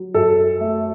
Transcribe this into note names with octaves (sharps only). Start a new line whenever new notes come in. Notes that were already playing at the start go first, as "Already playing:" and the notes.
Already playing: F#3
F#2 A4
A3